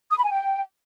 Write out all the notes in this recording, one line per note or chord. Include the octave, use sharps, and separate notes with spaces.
D#6
B5
G#5
G5